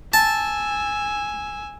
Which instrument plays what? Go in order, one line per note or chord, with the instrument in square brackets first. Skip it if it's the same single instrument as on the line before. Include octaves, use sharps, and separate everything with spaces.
[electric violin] G#5 E6 [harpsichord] A5